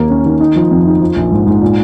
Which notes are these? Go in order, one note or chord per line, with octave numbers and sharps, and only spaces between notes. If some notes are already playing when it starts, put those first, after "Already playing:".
Already playing: D#2 A#3
C#4
D#3
D#4
F3
F2
D#4
F3
A#1
G#2
G#2
A#2